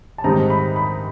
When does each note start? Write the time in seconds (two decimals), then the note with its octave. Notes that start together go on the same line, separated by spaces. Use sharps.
0.18 A5
0.24 G#2 D#3 G3 C4 D#4 A#5
0.50 B5
0.76 B5